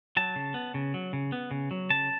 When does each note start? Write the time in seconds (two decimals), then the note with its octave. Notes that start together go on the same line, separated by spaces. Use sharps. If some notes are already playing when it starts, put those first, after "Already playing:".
0.17 F#3 A5
0.36 C#3
0.54 B3
0.74 C#3
0.94 F#3
1.13 C#3
1.32 B3
1.51 C#3
1.71 F#3
1.90 C#3 A5